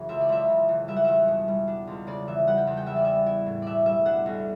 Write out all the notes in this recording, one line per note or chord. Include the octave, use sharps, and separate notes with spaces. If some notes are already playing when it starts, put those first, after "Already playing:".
Already playing: F#1 C#3 E3
C#2 E5
D5
C#2 E5
C#3
E3
G3 E5
F#5
E2 E5
B2
G3
D4
C#2
C#3 D5
E3 E5
G3 F#5
G5
E2
G5
G3 E5
D5
B3 E5
E4
A2
B2 D5 E5
G3 E5
D4 F#5
B1